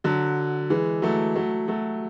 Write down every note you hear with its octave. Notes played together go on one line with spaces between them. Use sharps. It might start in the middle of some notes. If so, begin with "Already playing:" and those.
D3 F#3
E3 G#3
F#3 A3
F#3 A3
F#3 A3